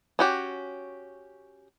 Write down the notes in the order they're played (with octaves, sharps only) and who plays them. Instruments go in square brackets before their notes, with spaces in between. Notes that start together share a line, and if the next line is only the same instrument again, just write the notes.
[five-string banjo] C#4 F#4 G4